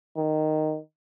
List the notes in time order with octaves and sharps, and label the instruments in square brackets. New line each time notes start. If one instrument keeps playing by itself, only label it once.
[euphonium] D#3